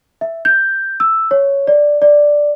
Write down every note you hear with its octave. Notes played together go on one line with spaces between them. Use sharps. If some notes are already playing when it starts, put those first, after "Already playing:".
E5
G6
E6
C#5
D5
D5